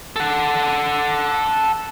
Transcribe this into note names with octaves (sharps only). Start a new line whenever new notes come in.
A4 F#5